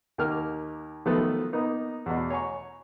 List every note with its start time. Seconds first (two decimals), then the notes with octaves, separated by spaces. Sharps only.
0.18 D#2 A#3 F6
1.06 D#3 F3 F#3 A3 B3
1.53 A#3 B3 D#4
2.06 E2 B2
2.30 C#5 G#5 A#5 C#6